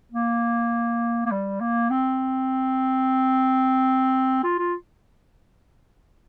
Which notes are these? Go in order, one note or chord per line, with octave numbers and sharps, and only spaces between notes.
A#3
A#3
G3
A#3
C4
F4
F4